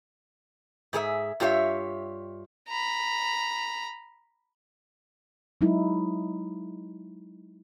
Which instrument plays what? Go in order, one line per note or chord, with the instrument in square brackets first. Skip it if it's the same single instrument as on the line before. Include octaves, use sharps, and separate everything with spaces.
[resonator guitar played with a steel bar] G#2 G#4 A4 E5
G2 F4 G4 C#5 E5
[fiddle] A#5 B5
[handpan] F#3 G#3 D#4 E4